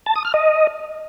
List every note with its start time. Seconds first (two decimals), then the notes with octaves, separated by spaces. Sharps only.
0.06 A5
0.16 D#6
0.25 F6
0.34 D#5